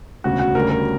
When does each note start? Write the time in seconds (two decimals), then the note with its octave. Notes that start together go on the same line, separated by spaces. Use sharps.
0.24 E1 D2 C#3 F#4
0.39 F#4
0.55 D2 C#3 G3 A#4
0.70 A#4